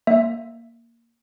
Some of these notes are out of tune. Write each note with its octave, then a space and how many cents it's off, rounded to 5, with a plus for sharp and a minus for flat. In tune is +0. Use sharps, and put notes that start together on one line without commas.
A#3 +0 E5 +0